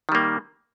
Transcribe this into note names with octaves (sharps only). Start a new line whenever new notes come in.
D#3 G3 A#3